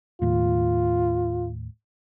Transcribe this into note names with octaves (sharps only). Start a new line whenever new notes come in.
D#2 A2 F4